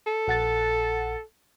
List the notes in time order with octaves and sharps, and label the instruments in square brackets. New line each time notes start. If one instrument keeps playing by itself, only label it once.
[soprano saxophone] A4
[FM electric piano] A#1 F#5 A6